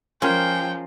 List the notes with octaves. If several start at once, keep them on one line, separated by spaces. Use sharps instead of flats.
F3 G#3 C#4 F4 A#4 C5 G5